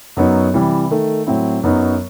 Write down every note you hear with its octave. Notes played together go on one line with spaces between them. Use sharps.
F#2 F#3 B3 D#4
C3 E3 G3
D#3 A3 D#4
A2 F#3 C4 E4
F#2 F#3 B3 D#4